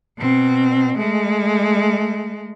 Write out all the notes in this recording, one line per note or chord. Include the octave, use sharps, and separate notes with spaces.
B2 C4
G#3 A3